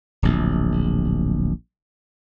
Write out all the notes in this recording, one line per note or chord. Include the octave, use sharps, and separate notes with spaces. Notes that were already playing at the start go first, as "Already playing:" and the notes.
D1 A#1